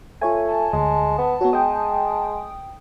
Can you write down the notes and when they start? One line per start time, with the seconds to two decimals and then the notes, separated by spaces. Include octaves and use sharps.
0.22 A3 F4 C#5 G#5
0.46 A5
0.73 D2 G#3
1.18 B3
1.41 F#3 B3 F#4
1.53 G#3 G5 D#6